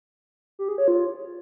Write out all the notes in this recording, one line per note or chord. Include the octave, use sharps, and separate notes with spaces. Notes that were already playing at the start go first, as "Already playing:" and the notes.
G4
G#4
C#5
F4